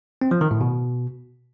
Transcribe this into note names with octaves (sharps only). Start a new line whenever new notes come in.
C4
F3
D#3
A2
B2